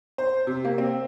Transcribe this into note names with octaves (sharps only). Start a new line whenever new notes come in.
C5
C3
A#3
C4